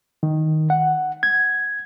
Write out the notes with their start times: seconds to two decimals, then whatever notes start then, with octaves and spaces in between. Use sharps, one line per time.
0.23 D#3
0.70 F#5
1.23 G#6